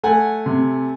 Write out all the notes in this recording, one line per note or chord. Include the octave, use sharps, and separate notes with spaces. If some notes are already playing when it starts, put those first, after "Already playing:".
A3 F#5 G#5
C3